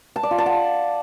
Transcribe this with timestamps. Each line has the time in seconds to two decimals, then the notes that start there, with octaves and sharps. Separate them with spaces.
0.16 A5
0.23 D5
0.31 F4
0.38 A5
0.46 F#5